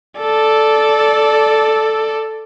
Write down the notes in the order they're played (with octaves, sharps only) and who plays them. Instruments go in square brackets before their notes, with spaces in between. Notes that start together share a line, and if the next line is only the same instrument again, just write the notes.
[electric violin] A4 D5